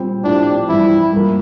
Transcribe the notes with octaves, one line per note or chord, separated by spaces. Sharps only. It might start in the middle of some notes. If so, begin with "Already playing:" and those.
Already playing: A#2 G3 C4
A2 F3 C4 D4 G4
G2 E3 G3 E4
G2 F3 A#3